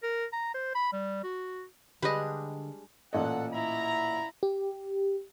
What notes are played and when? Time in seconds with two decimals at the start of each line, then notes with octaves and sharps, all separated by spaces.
0.03 A#4
0.33 A#5
0.55 C5
0.75 B5
0.93 G3
1.24 F#4
2.02 D3 G3 G#3 D4 B4 D#5
3.13 A1 A#2 A4 D#5 F#5
3.53 E4 A#5
4.43 G4